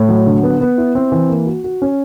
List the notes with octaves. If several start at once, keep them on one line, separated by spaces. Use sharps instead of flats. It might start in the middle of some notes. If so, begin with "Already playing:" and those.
Already playing: A2
F#3
D3
B3
B3
E4
C4
E3
A#3
F#4
F#4
C#4